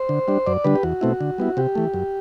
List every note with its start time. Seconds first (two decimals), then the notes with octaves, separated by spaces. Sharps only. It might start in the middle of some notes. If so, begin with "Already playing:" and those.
Already playing: C5
0.09 D3
0.28 G3 D4
0.47 F#2 D5
0.64 D3 G3 D4 B4
0.76 G4
0.83 E2 F#4
1.01 B2 A3 C4 E4
1.21 D3
1.38 G3 B3 E4
1.57 C3 G4
1.75 E3 A3
1.94 F#2